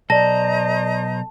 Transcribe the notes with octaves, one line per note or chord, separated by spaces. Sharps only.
B1 A4 C5 D5 D#5 A5 A#5 A#6